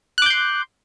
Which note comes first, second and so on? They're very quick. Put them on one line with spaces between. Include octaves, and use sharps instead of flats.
F#6 D6 G6 C6